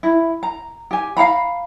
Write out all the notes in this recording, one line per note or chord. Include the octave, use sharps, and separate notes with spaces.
E4
A#5
G4 G#5
F5 F#5 A#5 B5